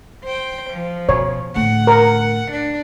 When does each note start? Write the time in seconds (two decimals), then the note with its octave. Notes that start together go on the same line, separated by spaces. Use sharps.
0.24 C5 G5
0.71 F3
1.09 B2 C#5
1.56 A2 D3 F#5
1.87 A#4
2.52 D4